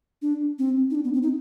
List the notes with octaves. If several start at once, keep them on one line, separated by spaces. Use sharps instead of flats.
D4
C4
D#4
D4
B3
C4
D#4